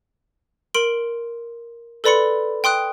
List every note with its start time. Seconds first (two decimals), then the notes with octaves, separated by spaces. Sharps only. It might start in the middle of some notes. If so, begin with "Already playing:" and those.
0.74 A#4 C6 D7 F#7
2.04 A4 B4 D5 B5 C6 C#7
2.64 G5 C6 D#6 F#6